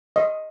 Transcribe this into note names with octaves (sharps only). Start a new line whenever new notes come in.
D#5